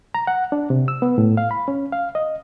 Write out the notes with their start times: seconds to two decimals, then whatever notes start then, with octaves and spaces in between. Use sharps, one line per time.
0.15 A#5
0.27 F#5
0.52 D4
0.70 C3
0.88 E6
1.02 B3
1.18 A2
1.37 F5
1.51 B5
1.68 C#4
1.92 F5
2.15 D#5